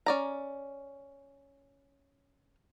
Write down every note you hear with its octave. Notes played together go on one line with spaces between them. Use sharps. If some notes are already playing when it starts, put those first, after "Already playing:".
C#4 D5 A#5